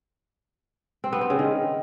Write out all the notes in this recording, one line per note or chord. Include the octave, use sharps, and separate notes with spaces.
C4
B3
C4
C#3
D#3